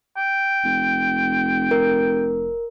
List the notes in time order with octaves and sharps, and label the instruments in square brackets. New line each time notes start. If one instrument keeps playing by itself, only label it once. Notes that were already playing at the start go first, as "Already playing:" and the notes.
[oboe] G5
[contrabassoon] F1
[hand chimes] A#4